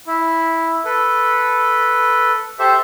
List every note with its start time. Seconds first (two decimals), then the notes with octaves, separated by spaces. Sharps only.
0.07 E4
0.85 A4 B4
2.59 G4 A4 C5 E5